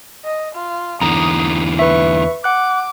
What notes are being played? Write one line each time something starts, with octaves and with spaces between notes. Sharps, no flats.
D#5
F4
E2 D3 E3 A#5 D#6
B4 E5 C#6
F#5 D6 F#6